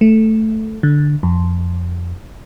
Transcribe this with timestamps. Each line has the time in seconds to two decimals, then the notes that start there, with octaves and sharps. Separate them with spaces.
0.01 A3
0.83 D3
1.23 F2